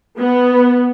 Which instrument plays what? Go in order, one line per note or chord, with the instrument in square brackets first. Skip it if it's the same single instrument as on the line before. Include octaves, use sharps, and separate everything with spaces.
[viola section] B3